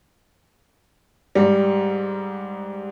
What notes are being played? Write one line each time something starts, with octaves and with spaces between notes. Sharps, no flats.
G#2 G3